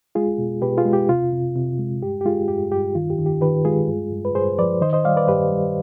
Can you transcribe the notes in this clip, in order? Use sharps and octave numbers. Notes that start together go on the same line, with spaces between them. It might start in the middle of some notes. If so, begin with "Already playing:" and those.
G#3 F4 G#4
B2
B2 G4 B4
F4 G#4
G#3
G4
C3 F4
C3
C3
G#3
G2 G4
G4
G#3 F4 G#4
G2 G4
G2 G4
D#3 F4
G4
D#3
G4
D#3 G4 B4
G#3 F4 G#4
G2
G2
B4
G2 G#4 C5
F3 B4 D5
D#3 C5 D#5
C5 D#5
G3 D5 F5
B4 D5
G2 G4 B4
G3